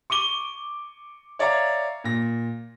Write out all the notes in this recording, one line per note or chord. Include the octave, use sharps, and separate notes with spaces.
C#6 D6 D#7 G7
C#5 D5 E5 F5 A#5 C#6
A#2 A#6